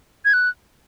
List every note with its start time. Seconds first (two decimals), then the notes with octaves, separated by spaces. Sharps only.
0.25 G#6
0.33 F#6